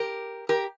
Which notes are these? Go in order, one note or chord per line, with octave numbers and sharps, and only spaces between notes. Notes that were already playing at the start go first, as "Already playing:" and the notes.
Already playing: G4 A#4
G4 A#4